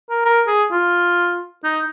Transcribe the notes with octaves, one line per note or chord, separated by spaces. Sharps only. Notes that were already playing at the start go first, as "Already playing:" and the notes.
A#4
A#4
G#4
F4
D#4